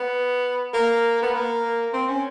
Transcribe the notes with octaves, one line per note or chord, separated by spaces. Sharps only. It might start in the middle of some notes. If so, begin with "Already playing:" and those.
Already playing: B3
A#3
B3
A#3
C4
C#4